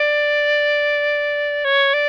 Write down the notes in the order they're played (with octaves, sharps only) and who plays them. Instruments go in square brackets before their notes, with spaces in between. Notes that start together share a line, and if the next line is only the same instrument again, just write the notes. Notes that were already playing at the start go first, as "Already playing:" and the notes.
Already playing: [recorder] D5
C#5
D5